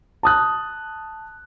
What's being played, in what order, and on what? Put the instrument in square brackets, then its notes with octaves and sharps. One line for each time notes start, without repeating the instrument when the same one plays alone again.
[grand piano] A5 D#6 F#6